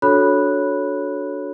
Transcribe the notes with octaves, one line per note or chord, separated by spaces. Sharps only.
D4 F#4 A4 C#5 B5 F#6